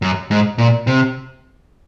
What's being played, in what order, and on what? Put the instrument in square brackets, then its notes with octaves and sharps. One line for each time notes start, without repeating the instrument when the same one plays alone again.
[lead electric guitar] F#2
G#2
A#2
C3